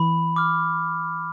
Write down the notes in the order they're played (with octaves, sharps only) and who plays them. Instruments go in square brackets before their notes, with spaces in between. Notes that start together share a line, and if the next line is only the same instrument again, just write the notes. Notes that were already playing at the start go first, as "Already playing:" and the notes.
Already playing: [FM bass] E3 [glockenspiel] B5
[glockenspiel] D6 F6